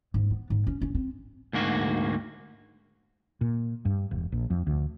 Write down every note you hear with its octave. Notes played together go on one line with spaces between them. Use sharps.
G#2
B3
G#2
C#4
C#4
C4
D2 G#2 A#3 F#4
A#2
G2
E1
A#1
F2
D2